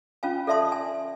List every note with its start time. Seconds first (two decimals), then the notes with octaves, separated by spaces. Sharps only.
0.23 C#4 F4 F5 G#5
0.47 A4 D5 E5 A5 C6 D#6
0.72 G#5